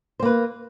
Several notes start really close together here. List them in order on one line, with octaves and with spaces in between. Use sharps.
C5 A#3 B4